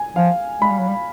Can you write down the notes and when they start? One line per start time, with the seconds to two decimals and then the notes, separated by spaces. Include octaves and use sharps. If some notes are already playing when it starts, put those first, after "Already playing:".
Already playing: G#5
0.16 F3 F5
0.61 G#3 B5
0.70 G3
0.79 F#3
0.89 G3